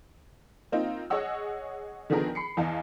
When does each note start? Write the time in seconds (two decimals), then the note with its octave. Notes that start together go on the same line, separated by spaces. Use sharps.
0.72 A#3 C4 D#4 F4
1.10 G#4 C#5 D#5 F#5 E6
2.10 D3 D#3 F3 B3 G#4 A#4
2.35 B5 C7 C#7
2.57 E2 E3 D#5 F5 A5